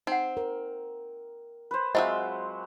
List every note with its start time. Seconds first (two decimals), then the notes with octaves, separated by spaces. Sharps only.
0.07 C4 D#4 F#5
0.37 A#4
1.71 B4 C5
1.95 F#3 G#3 C4 F4 D#5 E5 F#5